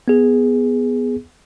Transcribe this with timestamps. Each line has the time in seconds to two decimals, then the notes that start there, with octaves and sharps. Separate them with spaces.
0.08 B3 G#4